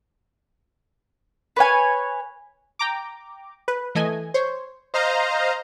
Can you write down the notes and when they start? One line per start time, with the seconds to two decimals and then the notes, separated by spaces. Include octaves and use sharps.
1.56 B4 C#5 G#5
2.79 G5 A#5 D6
3.68 B4
3.95 E3 A3 D#5 G#5
4.34 C5 C#5
4.94 C5 D#5 F5 A#5